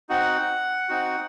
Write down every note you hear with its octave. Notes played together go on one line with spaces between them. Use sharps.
C4 D#4 F#4 F#5
C4 D#4 F#4